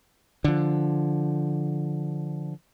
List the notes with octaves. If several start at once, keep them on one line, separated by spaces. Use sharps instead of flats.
D3 F3